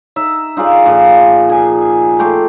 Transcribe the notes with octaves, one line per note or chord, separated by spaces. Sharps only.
D#4 E5
D#4 F4 G#4 D5
A#2 F3 A#3
G#4 G#5
A3 G5 C6 D6